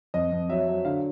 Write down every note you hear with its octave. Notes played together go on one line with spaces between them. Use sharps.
F2 D#5
F2
F#3 E5
F#3
D3 F5